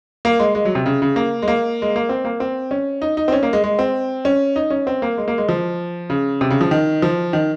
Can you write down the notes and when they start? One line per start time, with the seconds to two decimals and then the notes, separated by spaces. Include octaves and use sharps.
0.25 A#3
0.39 G#3
0.55 G#3
0.65 F#3
0.75 C3
0.86 C#3
1.02 C#3
1.16 A#3
1.42 G#3
1.48 A#3
1.82 G#3
1.96 A#3
2.09 C4
2.25 A#3
2.40 C4
2.71 C#4
3.02 D#4
3.17 D#4
3.28 C4
3.32 C#4
3.43 A#3
3.53 G#3
3.64 G#3
3.79 C4
4.25 C#4
4.56 D#4
4.70 C#4
4.87 C4
5.02 A#3
5.18 G#3
5.28 A#3
5.38 G#3
5.49 F3
6.10 C#3
6.41 C3
6.50 C#3
6.61 F3
6.71 D#3
7.02 F3
7.33 D#3